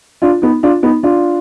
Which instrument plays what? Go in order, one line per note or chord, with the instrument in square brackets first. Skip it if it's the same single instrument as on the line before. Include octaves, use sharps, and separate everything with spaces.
[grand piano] D4 F4
B3 D#4
D4 F4
B3 D#4
D4 F4